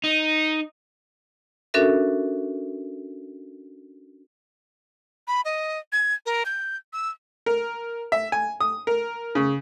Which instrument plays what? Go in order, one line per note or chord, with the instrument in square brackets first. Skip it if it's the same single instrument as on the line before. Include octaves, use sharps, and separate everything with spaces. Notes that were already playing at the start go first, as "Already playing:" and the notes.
[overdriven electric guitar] D#4
[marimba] C#4 D4 F#4 A4 A#4 E5
[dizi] B5
D#5
G#6
A#4
G6
E6
[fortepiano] A#4
E5
G#5
D#6
A#4
C#3